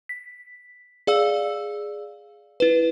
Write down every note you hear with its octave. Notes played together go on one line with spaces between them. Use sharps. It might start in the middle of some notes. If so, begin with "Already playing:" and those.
B6
G#4 D5 F5 E6
E4 B4